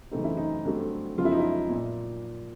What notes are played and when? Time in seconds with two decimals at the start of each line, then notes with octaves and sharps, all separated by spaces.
0.11 F#2 C#3 E3 A3 C4 D#4
0.24 E4
0.37 D#4
0.65 G2 D3 F#3 A3 C4
1.17 F#2 C#3 F3 G#3 B3 F4
1.25 E4
1.32 D#4
1.39 E4
1.70 A#2